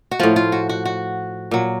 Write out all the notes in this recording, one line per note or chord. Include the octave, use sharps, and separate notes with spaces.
F#4
A2 F3 F4
F4
F#4
F#4
F#4
A#2 F#3